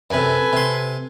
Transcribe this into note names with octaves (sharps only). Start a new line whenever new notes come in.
F#2 C3 A4 B4 G#5
C3 C6